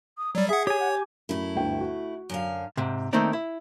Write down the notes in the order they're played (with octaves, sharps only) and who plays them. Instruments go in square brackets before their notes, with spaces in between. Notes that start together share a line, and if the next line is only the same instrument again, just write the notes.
[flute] D#6
[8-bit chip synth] F#3 G3 [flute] D5
[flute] G#4 [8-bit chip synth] E5 F#5
[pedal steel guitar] G4 G#5 [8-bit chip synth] C#5
[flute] F#5
D6
[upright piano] F#2 [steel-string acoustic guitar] A3 E4
[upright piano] G1 D2 G5
F#4
[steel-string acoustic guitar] F#2 D3 F5
[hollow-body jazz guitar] G#2 C3
D#3 A3 A#3 C4 D#4 D5
E4